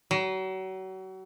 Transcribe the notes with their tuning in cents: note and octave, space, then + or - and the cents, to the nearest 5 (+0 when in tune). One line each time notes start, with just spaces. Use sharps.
F#3 +35